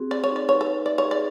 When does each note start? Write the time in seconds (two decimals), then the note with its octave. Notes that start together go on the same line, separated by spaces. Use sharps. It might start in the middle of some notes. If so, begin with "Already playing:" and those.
Already playing: C4 F#4 G#4
0.11 C5 D5
0.24 C#5
0.30 D#4
0.36 D5
0.48 B4 C#5
0.61 A4
0.67 D#4
0.86 D5 E5
0.98 C#5
1.04 G#4
1.11 D5